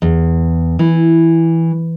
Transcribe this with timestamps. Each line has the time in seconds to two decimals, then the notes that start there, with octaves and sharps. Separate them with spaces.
0.02 E2
0.79 E3